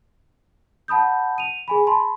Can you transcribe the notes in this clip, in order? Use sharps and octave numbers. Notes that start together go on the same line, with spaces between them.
F#5 A5 B5 D#6 G6
D#7 F7
G#4 G#5 B5
A5 B5 C6